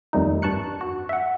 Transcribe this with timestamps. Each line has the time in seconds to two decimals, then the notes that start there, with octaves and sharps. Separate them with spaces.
0.13 F2 D#3 G3 A3 D#4
0.42 G2 A5 C#6 F#6 C#7
0.81 F#4
1.09 E5 F#5